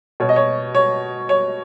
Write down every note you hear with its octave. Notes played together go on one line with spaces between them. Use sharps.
B2 C#5
D#5
C#5
C#5
C#5